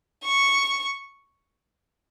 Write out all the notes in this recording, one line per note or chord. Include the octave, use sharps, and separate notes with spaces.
C#6